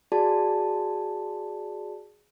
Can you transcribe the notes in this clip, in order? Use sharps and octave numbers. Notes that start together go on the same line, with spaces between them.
F#4 G#4 D5 A5